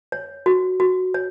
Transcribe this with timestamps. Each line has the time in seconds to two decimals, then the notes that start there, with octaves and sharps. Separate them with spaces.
0.12 C#5
0.46 F#4
0.80 F#4
1.14 C#5